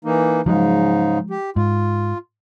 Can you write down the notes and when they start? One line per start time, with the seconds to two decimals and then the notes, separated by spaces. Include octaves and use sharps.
0.05 E3 A#3 D#4
0.46 G#2 C#3 F3 F#3 G#3 D#4
1.30 G4
1.56 G#2 F4